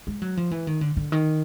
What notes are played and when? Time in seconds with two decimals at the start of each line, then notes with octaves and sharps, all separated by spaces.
0.07 G#3
0.22 F#3
0.37 F3
0.51 E3
0.67 D#3
0.81 D3
0.97 D3
1.12 D#3